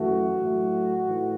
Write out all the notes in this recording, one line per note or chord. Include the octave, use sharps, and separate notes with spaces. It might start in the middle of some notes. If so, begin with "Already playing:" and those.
Already playing: F#2 E3 A3 F#4
A2 F#3 A3
A2 E3